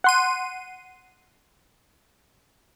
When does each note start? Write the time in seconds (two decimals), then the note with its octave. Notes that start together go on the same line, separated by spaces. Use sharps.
0.04 F#5 C6 D#7